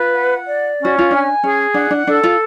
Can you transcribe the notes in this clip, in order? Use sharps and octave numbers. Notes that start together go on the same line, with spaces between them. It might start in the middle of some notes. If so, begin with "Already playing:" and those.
Already playing: F4 B4
F#5
D5
C#4
F#4
F4
D4 G#5
C#4 G#4
D4 F#5
D4
D4 A4
F4